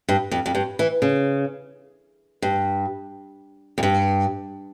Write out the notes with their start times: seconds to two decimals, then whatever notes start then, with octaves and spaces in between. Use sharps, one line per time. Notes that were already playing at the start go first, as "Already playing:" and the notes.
0.09 G2
0.31 F2
0.46 F2
0.55 G2
0.79 E3
1.02 C#3
2.42 G2
3.78 F2
3.83 G2